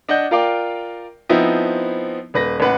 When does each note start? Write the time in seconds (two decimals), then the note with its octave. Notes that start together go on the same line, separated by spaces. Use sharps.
0.09 D4 D#5 F#5 G6
0.31 F4 A#4 D5 F5 G5 D6
1.29 F3 B3 C4 D#4 E4
2.34 D#1 B4 A#6
2.60 A1 B4 F#5